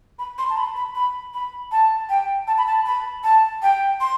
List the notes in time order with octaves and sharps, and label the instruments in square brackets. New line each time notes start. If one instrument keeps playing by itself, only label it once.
[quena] B5
C6
A5
B5
B5
B5
B5
A5
G5
A5
B5
A5
B5
A5
G5
C6